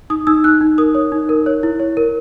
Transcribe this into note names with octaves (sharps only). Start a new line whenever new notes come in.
D#4 D#6
D#4 E6
D#4 F#6
D#4
A#4 D#6
C#5
D#4
A#4
C#5
E4
C#5
A#4